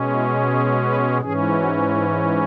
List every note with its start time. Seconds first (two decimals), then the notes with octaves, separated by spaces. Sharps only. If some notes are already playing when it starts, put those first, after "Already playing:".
Already playing: B2 G#3 C#4
0.14 E4
0.50 G#4
0.85 B4
1.22 G#2 E3 C#4 G#4
1.58 F#4
1.93 E4